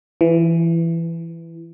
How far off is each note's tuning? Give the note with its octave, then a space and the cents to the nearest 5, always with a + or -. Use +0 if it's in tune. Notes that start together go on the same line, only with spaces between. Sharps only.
E3 +15